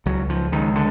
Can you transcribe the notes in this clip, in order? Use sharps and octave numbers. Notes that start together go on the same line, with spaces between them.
C#2 F#3
F3
C#2 D#3
D3